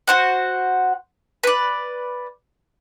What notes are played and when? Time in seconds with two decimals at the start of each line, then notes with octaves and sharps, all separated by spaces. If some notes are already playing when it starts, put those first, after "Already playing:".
0.07 F#4 C5 F#5
1.43 B4 D5